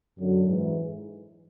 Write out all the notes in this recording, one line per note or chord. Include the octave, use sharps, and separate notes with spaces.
F#2 D3 F#3
G#2 E3